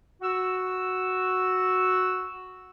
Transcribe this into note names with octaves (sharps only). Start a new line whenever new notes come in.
F#4 E6